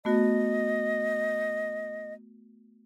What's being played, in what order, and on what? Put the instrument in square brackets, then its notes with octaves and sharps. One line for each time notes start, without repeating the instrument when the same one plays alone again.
[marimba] A3 B3 F#4 [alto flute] D#5